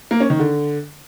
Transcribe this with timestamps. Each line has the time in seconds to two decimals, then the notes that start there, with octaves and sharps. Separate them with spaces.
0.11 A#3
0.20 C#4
0.30 D#3
0.39 D3